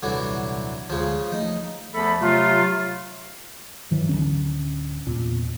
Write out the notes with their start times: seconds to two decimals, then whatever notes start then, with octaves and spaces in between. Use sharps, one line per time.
0.03 D#1 C2 D3 E3 F#3
0.90 D2 C#3 F3 G#3
1.32 F3 A3 D#4
1.94 E2 F3 A3 A4 B5
2.21 C3 F#3 A3 F4
3.91 G2 D#3 E3 F#3
4.09 D1 D#2 D3 C#4
5.07 E2 A#2